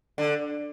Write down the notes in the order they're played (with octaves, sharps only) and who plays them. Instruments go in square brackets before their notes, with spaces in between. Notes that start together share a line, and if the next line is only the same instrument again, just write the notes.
[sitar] D3